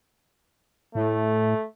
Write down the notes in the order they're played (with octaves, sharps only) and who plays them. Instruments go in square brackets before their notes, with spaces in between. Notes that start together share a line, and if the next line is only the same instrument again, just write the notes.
[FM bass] A2 [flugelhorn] A3